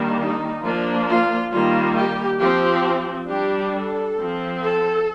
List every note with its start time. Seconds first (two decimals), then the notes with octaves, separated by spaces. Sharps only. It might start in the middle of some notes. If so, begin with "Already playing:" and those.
Already playing: D#3 G3 A#3 D4
0.20 D#4
0.63 F3 A#3 D4 F4
1.08 F4
1.52 D#3 G3 A#3 F4
1.97 G4
2.40 F3 C4 G4
3.29 G3 D4 G4
3.74 A4
4.18 F3 C4
4.62 A4